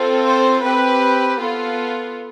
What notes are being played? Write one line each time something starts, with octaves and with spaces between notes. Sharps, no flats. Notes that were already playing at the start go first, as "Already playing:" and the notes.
Already playing: C4 F4 A4
C5
C4 G4 B4
B3 F4 A4